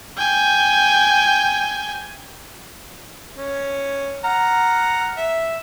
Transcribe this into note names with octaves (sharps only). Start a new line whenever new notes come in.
G5 G#5
C#4
F#5 A#5 F6
E5